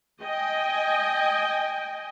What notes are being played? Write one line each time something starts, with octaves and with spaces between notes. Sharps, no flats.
D#5 G5 G#5